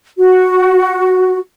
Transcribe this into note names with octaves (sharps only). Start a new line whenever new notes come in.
F#4